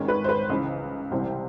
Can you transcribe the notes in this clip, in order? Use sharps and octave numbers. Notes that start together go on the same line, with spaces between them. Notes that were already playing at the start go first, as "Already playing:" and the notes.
Already playing: G#1 G#2 D#3 G#3 C#4
B4
C5
B4
C#2 C#3 E3
C2 C3 E3 G3 C5